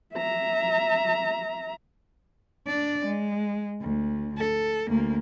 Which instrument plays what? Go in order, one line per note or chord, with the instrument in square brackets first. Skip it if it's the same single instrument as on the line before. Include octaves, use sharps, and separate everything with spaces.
[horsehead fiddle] E5 A#5
[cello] D4 D5
G#3
D2
A4
D2 A#3